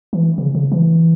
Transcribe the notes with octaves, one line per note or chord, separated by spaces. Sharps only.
E3
C#3
C#3
E3